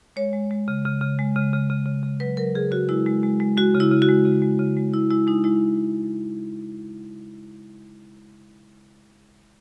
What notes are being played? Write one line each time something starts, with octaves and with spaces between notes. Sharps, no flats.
G#3 C#5
G#3
G#3
C#3
C#3
C#3
G#3
C#3
C#3
C#3
C#3
C#3
F#3 B4
F#3 A#4
C#3 G#4
C#3 F#4
G#3 E4
G#3
G#3
G#3
G#3 F#4
C#3
E4
C#3
F#4
G#3
C#3
G#3
C#3
G#3
C#3 E4
G#3 E4
G#3 D#4
G#3 E4